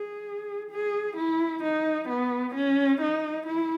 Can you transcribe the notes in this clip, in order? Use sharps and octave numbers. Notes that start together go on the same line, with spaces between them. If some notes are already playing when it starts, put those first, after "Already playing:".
Already playing: G#4
G#4
E4
D#4
B3
C#4
D#4
E4